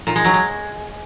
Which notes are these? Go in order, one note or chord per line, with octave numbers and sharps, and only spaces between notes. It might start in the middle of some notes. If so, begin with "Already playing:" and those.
A#2
G#3
F#3
G#3